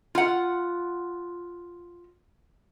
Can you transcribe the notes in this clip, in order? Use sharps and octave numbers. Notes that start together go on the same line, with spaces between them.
F4 F#5